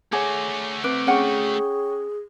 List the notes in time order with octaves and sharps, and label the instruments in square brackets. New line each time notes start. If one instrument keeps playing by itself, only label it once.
[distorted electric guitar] A3 F#4 [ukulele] G#4 [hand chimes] C#5 F#5 D6
[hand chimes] C4 D6 D7 [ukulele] B4
[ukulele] C#4 F#5 [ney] G#4 [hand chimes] C#5 G5 C#6